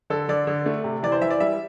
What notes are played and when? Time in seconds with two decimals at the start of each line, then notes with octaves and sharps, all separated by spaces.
0.10 D3 A4
0.29 D3 D5
0.47 D3
0.66 A3
0.84 C3
1.03 E3 D5
1.12 C5
1.21 E3 E5
1.30 D5
1.40 G3 E5